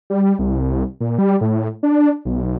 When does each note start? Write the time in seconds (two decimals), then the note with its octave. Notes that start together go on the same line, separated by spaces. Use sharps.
0.10 G3
0.39 C2
1.00 A#2
1.18 G3
1.41 A2
1.83 D4
2.25 B1